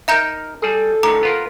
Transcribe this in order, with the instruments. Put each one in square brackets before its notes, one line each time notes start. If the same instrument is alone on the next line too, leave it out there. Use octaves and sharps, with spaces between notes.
[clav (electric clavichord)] D#4 A#4 [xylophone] E5 A#5 G6
[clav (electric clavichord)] G3 G#4 [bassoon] A4
[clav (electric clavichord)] A2 D3 D#3 [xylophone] A#5 D6
[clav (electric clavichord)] B3 F4 A#4